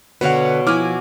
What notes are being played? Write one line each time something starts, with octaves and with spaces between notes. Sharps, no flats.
B2 D3 B4 C#5 F5 F#5
F3 E4 F#4 G#5 D6 F6